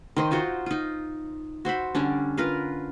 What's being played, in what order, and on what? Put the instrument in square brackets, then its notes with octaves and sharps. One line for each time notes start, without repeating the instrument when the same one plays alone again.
[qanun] D#3 C5 D#5
D#4 F4 F#4 C5
D#4 F4
F#4 C5 E5 B5
D3 G3 C#4 D4
F4 A#4 B4 F5